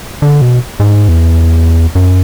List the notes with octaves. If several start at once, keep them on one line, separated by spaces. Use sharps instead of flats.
D3
B2
G#2
E2
F#2